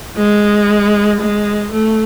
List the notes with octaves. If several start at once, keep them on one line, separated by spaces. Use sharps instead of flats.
G#3
G#3
A3